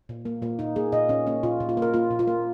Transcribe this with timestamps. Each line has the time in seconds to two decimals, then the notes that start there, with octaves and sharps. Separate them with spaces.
0.09 A#2
0.25 A#3
0.42 A#2 A#3
0.59 A#2 D#4
0.76 A#3 G#4
0.92 A#2 D#5
1.09 A#2 C#4
1.27 A#3 C#4
1.43 A#2 F4
1.60 A#2
1.69 F4
1.77 A#3 A#4
1.94 A#3 F4
2.11 A#2
2.19 F4
2.27 A#3